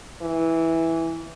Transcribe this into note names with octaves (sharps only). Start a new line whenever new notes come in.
E3